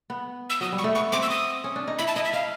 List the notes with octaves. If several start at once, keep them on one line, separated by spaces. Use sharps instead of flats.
B3
E6
F#3 D#6
G3
C#6
A3
B3 C#6
C4 D6
E6
D#6
C#4
D4
D#4
E4 B5
A5
E4 D#5
E5
D#4 F5